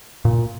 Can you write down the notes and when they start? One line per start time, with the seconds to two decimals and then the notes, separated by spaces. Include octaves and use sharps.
0.25 A#2